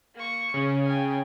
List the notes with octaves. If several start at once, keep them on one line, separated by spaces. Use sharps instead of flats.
A#3 C#6
C#3 C#4
G5 G#5